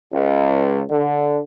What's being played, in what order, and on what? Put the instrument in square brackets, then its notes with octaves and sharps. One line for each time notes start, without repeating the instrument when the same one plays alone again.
[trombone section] C#2
D3